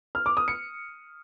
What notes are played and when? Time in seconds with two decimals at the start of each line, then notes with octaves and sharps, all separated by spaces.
0.15 F6
0.26 D6
0.37 D#6
0.48 C#7